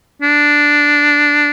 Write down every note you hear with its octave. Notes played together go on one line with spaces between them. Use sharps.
D4